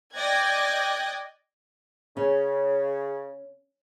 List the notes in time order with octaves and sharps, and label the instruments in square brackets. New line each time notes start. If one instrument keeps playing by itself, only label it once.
[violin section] D5 D#5 G5 F#6 G#6 A#6
[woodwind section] C#3 [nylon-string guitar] C#4